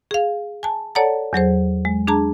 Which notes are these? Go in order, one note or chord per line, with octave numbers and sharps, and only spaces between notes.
G#4 F5
G#5 A5
A4 C#5 D5 F#5 A5 A#5
E2 F#3 G#4 C5
G#3
D4 G#4 A5 A#5